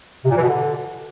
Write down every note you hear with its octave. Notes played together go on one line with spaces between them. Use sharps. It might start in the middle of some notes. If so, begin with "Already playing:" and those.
C3
A#2
E3
B2
D3